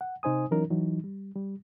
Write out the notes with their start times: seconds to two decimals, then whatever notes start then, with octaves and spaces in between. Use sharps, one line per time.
0.01 F#5
0.23 C3 D#4 C5 G#5 D#6
0.51 E3 F#3 C#4 D#4 A#4
0.71 E3 F#3 D#4
1.04 G3
1.36 G3